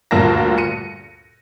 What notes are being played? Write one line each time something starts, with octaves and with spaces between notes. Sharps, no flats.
D2 G2 A#2 A#4 A5 A#6
C#7 D#7